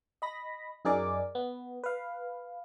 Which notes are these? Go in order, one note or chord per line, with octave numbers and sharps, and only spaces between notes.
D#5 B5 A#6
F#2 D#4 G#4 A#4 D5 D6
B3
B4 F5